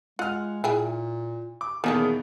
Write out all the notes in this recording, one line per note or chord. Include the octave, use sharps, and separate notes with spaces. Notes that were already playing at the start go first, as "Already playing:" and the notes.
G#3 F4 F#5 F6
A#2 E4 G#4 G5
D6
E2 B2 D#3 A#3 C#4 G#4 A4